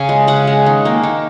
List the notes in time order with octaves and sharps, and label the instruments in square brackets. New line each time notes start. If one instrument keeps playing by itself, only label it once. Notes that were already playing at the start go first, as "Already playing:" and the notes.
Already playing: [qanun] C#3 G#5
G#3
C#3 F#5
G#3
D#3
A#3
D#3